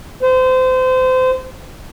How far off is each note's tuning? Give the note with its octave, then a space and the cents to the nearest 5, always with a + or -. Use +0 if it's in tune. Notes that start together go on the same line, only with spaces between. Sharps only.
C5 -30